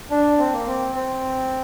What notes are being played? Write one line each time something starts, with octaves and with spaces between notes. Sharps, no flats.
D4
C4
A#3
C4
C4